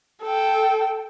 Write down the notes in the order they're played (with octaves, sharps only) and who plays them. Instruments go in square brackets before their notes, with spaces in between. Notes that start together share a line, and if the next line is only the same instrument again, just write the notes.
[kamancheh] A4 G5